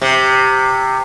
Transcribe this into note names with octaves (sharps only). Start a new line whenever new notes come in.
C3